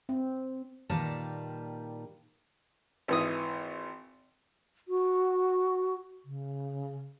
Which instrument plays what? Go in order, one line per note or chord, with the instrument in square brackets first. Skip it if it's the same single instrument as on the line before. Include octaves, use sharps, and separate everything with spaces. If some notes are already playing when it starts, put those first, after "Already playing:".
[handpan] C4
[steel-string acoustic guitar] A#2 D#3 G3 A#3 B4 A5
[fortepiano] G#1 E3 D#6
[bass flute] F#4
C#3